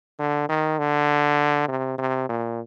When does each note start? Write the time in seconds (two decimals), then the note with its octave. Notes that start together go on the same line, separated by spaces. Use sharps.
0.19 D3
0.49 D#3
0.79 D3
1.68 C3
1.98 C3
2.29 A#2